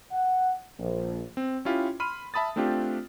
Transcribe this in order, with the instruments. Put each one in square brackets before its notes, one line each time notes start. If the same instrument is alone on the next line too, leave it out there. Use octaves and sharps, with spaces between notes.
[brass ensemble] F#5
A#1
[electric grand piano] C4
C#4 E4 F4 G4
B5 C6 F6 D#7
E5 A5 B5 D#6 A6
A3 C4 D4 F4 G4